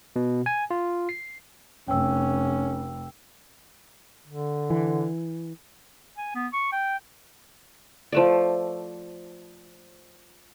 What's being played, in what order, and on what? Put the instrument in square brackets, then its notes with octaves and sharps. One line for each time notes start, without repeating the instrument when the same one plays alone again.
[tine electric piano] B2
G#5
F4
C7
[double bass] F1 [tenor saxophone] C#4 [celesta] G5 E6
[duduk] D3
[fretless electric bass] E3
[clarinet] G#5
B3
C#6
G5
[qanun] F3 A3 D5